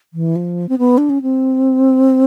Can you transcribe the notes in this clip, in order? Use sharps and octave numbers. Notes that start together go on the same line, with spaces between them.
E3
F3
C4
B3
D4
C#4
C4